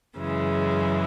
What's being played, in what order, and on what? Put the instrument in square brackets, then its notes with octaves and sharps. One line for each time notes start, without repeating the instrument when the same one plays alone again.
[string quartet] F#2 C#3 E3 G#3